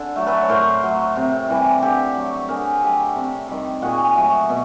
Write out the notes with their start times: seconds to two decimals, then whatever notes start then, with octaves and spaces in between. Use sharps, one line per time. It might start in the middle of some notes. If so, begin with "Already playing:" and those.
Already playing: D3 A4
0.16 F#3 A3
0.26 A4 B4
0.41 C#5
0.49 A2 A#4 C5
0.83 F#3 A3
1.16 C3
1.49 E3 G3
1.82 D3 G4 A4
2.16 F#3 A3
2.49 D3 G#4 A#4
2.82 F#3 A3 G4 A4
3.15 C3
3.49 D#3 G3
3.82 A#2 F#4 G#4
4.16 F#3 A3
4.49 B2